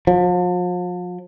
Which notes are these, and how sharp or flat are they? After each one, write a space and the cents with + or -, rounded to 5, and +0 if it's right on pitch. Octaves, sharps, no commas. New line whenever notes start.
F3 +40